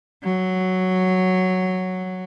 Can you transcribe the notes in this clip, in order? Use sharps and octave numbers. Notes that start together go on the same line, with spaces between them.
F#3